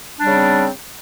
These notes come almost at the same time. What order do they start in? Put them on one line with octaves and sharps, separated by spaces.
D4 G3 C#3 C4